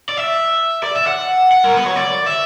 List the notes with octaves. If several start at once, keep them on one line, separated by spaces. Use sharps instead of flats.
D5
E5
D5
E5
F#5
F#5
A#4
B4
C#5
D5
E5